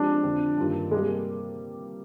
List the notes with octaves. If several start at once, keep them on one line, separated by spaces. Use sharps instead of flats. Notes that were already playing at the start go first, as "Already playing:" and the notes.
Already playing: F3 G#3 C4 D4 G4
F2 D3 F3 C4
G2 D#3 A#3 F4
C3 G3 G#3 A#3